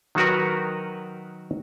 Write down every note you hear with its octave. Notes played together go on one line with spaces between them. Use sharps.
D#3 F#3 D#4 F#4 A#4 B4